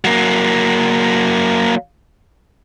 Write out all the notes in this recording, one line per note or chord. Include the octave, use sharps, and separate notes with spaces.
F#3 A#3